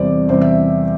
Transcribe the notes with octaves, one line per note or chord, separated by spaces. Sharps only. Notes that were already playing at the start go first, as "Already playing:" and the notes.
Already playing: E2 C3 G3 C4 C5 D5
E2 C3 G3 C4 C5
E5